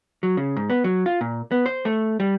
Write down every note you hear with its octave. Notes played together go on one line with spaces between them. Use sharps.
F#3
C#3
G#2
B3
F#3
F4
A#2
B3
C5
A3
G3